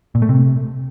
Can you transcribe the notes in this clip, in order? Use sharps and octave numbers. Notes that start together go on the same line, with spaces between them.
A#2
A3
C3